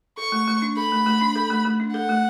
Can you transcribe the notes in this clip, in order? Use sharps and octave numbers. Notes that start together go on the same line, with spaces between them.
A4 C#6
A3
A3
D4
A4 B5
A3
A3
D4
A4
A3
A3
D4
A4 F#5
A3